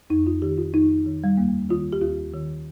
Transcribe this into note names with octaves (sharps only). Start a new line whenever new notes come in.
F2 D#4
F4
D#3 G4
F4
F2 D#4
D#3
G3
D#2 A#3
D#3 F4
G4
D#2 F4
D#3